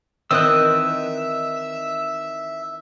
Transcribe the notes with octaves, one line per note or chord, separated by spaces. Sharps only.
D#3 E3 C4 D#5 E5 E6 F#6